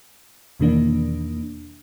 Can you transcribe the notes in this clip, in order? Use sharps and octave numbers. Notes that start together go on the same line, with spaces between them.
E2 B2 D#3 E3 A#3 D4